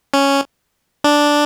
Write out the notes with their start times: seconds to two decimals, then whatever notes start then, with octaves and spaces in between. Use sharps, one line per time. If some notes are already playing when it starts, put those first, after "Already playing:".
0.14 C#4
1.04 D4